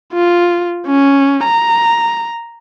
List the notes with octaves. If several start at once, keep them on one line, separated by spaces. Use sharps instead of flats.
F4
C#4
A#5